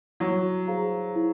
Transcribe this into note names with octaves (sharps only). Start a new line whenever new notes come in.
F#3 E4
G#4 C5 F5 A#5
E4